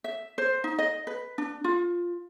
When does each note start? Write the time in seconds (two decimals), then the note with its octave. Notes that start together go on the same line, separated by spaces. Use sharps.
0.04 E5
0.38 C5
0.64 D#4
0.78 D#5
1.07 B4
1.38 D4
1.64 F4